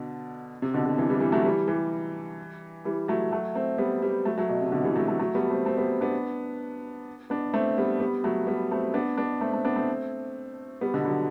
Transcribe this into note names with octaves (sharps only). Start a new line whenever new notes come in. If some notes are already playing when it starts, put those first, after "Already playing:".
Already playing: B2 D3
C3
B2 D3
B2 D3
C3 E3
E3 G3
E3 G3
F#3 A3
E3 G3
E3 G3
E3 G3
F#3 A3
F#3 A3
A3 C4
G3 B3
G3 B3
F#3 A3
F#3 A3
B2
C3
B2 D3
E3 G3
F#3 A3
F#3 A3
F#3 A3
G3 B3
A3 C4
A3 C4
G3 B3
B3 D4
B3 D4
A3 C4
G3 B3
G3 B3
F#3 A3
G3 B3
A3 C4
B3 D4
B3 D4
A3 C4
A3 C4
B3 D4
A3 C4
G3 B3
B2 D3
D3 F#3